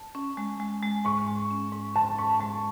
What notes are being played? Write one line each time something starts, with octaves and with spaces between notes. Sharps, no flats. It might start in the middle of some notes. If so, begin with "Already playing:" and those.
Already playing: A5
C#4
G#3
G#3
G#3
G#2 C#6
G#3
C#4
G#2
C#4 A5
G#2 C#6
G#3 A5